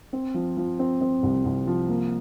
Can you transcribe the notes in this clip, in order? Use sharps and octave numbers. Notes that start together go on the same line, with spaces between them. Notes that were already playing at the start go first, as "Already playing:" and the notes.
C4
F3
F3
C4
C4
C2
C2
F3
A#3